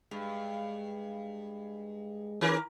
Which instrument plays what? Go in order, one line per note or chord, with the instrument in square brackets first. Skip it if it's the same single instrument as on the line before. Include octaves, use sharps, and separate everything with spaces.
[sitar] G2 [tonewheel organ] G#3
[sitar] D#3 A#4 [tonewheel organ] C#4 G#4 B4